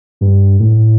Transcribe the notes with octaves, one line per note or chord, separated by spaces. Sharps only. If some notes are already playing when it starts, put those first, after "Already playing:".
G2
A2